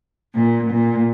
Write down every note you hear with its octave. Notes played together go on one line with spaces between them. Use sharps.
A#2
A#2